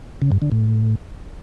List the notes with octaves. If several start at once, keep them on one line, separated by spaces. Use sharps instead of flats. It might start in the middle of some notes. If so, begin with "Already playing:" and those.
C#3
G2
D3
A2